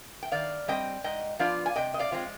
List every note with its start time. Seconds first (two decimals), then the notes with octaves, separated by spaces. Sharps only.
0.23 G5
0.32 D#3 D5 F5
0.68 G3 C4 D#5 G5
1.04 G#2 D#5 G5
1.39 F3 B3 D4 F4 D5 F5
1.66 G#5
1.76 C3 D#5 G5
1.94 D#5
1.99 D5 F5
2.12 F3 G#3 C4 F4